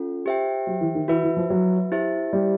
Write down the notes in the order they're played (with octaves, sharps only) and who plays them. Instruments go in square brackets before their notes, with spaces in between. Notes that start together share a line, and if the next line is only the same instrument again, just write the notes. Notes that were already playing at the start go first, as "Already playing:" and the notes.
Already playing: [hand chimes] C#4 F4 A4
G4 C5 E5 G5
[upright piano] F#3
E3
D#3
[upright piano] E3 [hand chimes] F#4 B4 E5
[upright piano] E3
F3
F#3
[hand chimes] E4 G4 C5 E5
[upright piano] G3